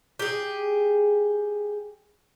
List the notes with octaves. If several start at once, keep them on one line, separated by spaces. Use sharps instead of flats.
G4 G#4